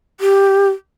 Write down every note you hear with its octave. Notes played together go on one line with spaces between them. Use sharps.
G4